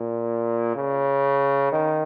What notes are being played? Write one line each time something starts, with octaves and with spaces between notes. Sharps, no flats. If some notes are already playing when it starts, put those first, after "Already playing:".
Already playing: A#2
C#3
D#3